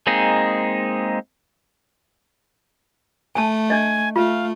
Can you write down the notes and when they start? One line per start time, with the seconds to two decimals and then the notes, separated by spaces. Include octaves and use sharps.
0.07 G#3 A#3 C4 D#4 G#4
3.35 A3 G#5 A5
3.70 D4 D#5 G#5
4.16 A3 F4 F5